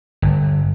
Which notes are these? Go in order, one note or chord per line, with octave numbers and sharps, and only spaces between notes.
G1